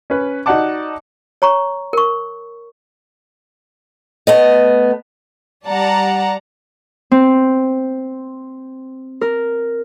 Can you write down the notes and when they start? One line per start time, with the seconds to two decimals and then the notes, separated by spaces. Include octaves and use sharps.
0.10 C#4 B4
0.46 D#4 F#4 D5 F#5 A5 D6
1.42 C#5 A#5 C#6
1.93 A#4 C#6
4.27 A3 B3 D#5
5.67 G3 D5 F#5 A5 A#5
7.11 C4
9.21 A#4